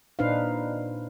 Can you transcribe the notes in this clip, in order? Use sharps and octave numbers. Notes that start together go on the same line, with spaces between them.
A#2 D4 D#4 B4 C5 F5